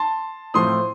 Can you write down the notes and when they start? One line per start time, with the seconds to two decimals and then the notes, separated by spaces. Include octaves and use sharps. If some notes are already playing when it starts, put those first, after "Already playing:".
Already playing: A5 C6
0.54 A2 F3 A3 C4 C6 D#6